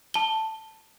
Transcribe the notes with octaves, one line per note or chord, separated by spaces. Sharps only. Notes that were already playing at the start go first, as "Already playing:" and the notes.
A5 G7